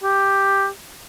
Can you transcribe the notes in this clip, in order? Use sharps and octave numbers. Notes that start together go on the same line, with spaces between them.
G4